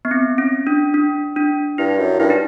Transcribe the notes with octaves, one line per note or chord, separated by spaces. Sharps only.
B3
C4
C#4
D4
D4
D4
G2 E4
F#2
G2 E4
D#4